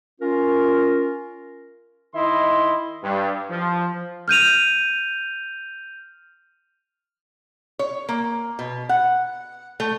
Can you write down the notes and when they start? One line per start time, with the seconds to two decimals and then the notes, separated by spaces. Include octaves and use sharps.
0.20 C#4 F4 A#4
2.15 D#3 E4 D#5 C6
3.03 G2
3.50 F3
4.28 F6 G6 D#7 F7
7.79 C#5
8.09 A#3
8.59 B2
8.89 F#5
9.80 A3